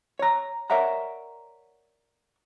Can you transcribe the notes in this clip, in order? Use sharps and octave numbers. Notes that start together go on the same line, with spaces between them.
C#5 A#5
A#4 C#5 D5 E5 F#5 A#5